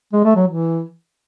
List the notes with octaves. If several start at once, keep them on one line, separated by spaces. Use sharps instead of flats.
G#3
A3
F#3
E3